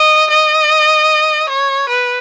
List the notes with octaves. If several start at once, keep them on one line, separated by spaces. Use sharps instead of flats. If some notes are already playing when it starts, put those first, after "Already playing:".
Already playing: D#5
D#5
C#5
B4